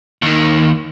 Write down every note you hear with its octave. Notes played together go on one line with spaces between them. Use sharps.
D#2 D#3